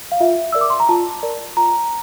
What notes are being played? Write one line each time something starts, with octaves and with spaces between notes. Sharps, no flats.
F5
F4 E5
A#4 D5 E6
D6
C6
A#5
F4 A5
A#4 D5
F4 A#5